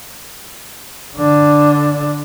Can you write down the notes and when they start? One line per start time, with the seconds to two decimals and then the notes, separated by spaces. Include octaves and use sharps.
1.17 D3 D4